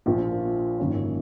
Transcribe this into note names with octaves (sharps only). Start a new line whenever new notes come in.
A#1 A#2 F3
G#1 F#2 D#3 A#3 C#4